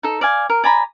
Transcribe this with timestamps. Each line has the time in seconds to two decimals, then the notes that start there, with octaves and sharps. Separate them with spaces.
0.03 D#4 A4
0.21 D5 F5 G#5
0.50 A#4
0.64 D5 G#5 A#5 B5